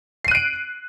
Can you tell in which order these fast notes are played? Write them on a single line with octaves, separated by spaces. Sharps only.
C7 D#7 F#6 D7